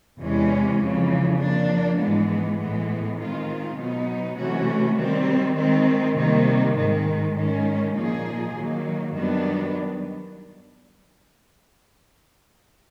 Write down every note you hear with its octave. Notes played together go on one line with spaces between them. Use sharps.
E2 C3 E3 G#3 C#4
F2 C#3 E3
F3 A#3 D4
G#2 E3 G#3 B3
A2 E3 G#3 B3
D#3 G#3 C4 F4
B2 F#3 B3 D#4
C3 E3 A3 C#4 F#4
D#3 G3 C4
D#3 G#3 C4
C3 D#3 G3 A#3
G#2 D#3 G#3
G#2 D#3 G#3 C#4
A#2 F3 A#3 D#4 G#4
D#3 F#3 A#3
F#2 D#3 G3 B3 D4